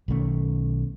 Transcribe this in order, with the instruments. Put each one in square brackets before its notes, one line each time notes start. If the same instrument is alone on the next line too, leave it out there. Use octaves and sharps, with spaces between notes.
[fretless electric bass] B1 D#3 A3 C#4